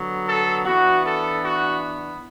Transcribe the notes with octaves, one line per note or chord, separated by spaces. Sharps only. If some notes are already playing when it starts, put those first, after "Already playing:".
Already playing: D3 F#3 B3
A4
E3 B3 D4 F#4
A4
F#4